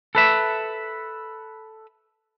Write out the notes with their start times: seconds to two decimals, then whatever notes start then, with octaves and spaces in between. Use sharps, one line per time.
0.15 A4 B4 E5